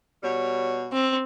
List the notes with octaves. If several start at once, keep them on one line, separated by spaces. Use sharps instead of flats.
B2 G3 C#5
C4